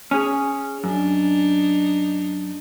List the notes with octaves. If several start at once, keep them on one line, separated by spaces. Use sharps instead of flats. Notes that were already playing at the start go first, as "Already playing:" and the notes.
C#4 G#4
F#2 D4 D#4